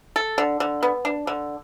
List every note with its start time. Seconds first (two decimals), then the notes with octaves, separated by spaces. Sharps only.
0.16 A4
0.38 D3
0.60 D3
0.83 B3
1.05 D4
1.27 D3